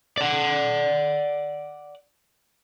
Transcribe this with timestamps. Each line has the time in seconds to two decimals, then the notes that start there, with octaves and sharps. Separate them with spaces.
0.18 D5 F#5